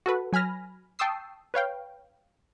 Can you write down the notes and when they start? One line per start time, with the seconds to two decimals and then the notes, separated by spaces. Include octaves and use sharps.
0.06 F#4 A4 B4
0.33 F#3 G#5 B5 F6 A#6
0.99 G5 A5 C#6 D#6 E6 C7
1.54 B4 C#5 F5 G5